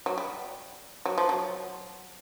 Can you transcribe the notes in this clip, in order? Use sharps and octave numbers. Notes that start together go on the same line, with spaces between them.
F#3
G3
F#3
F3
F#3